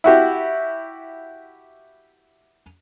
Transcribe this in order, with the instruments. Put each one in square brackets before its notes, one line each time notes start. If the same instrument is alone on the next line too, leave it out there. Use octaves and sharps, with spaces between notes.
[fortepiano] E4 F#4 G4